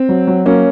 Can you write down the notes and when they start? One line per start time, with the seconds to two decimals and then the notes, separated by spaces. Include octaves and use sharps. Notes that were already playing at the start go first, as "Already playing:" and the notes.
Already playing: C4
0.09 F#3
0.27 F#3
0.46 F#3 A#3 C#4